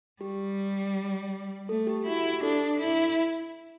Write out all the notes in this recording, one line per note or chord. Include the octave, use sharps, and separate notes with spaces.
G3 G4
A3 A4
G4
E4 F#4
G4
D4 A4
E4